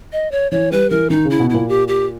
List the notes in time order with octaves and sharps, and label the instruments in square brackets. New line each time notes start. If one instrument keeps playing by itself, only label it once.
[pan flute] D#5
C#5
[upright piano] E3 [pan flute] C#5
[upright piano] G3 [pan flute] B4
[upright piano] E3 [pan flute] A#4
[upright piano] D#3 [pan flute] D#4
[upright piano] C#3
[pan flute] E4
[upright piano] B2
[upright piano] A#2 [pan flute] E4
[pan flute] G4
G4